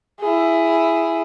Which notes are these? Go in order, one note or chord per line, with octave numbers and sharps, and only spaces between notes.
E4 G#4